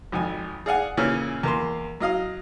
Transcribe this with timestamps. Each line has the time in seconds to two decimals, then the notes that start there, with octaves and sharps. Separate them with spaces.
0.12 G#1 F2 G#5
0.66 G#4 D5 F5 F#5 G#5
0.97 A#2 C#3 E3 C#4
1.43 E2 A#3 C6
2.00 F#3 D#5 F5 D#6